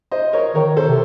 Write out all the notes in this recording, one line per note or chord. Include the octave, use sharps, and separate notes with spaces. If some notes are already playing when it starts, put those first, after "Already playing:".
C5 D#5
A#4 C#5
D#3 A#4 C#5
A4 C5
C3